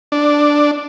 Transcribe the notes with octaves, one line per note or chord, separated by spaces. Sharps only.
D4